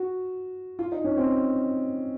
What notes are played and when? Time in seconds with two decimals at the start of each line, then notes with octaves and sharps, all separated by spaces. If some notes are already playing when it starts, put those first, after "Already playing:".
Already playing: F#4
0.79 F4
0.92 D#4
1.04 C#4
1.17 C4